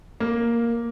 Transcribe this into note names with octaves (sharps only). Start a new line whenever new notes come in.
A#3